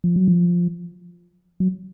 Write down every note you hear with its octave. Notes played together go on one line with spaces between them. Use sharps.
F3
F#3
F3
F#3